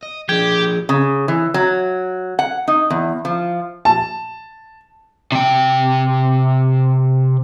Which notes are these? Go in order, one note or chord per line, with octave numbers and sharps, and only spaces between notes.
D#5
F3 D4 G4 G#4 G#6
C#3
E3
F#3
F#5
D#4
E2
F3
A5
C3 G5